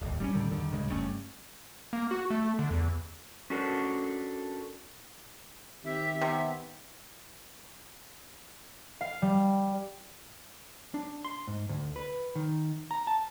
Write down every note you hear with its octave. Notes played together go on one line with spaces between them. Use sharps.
D#1 G#1 D#2
G3 C4 C#4
A2 D3 D#3 G3
E2 G2 D3 D#3
D1 G2 C#3 G#3
F#1 G2 A3 C#4
A#3
F#4
A3
D3
E2
C#4 D4 F#4 A4 A#4 C5
D#3 C4 G4 E5
C3 B3
F5
G3
D4
C6
G#2
D2
B4
D#3
A#5
A5